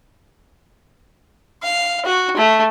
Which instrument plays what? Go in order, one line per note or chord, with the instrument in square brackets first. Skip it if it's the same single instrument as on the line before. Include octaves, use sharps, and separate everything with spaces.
[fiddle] F5
F#4
A3